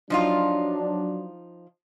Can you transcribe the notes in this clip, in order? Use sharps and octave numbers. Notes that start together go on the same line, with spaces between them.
F3 F#3 D4 D#4 F4